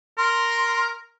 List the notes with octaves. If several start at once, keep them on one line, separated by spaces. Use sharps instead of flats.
A#4 C6